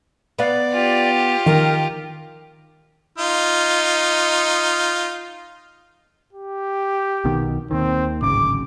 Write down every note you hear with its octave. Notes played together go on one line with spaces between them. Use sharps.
B3 D5 F5
F4 G4
D#3 A#4
D#4 F4
G4
B1 B2 D#3
D#2 D#3 C4
D1 G#1 C#3 D6